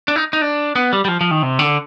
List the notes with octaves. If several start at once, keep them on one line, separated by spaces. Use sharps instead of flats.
D4
D#4
D#4
D4
B3
G3
G3
F3
F3
D#3
C3
D3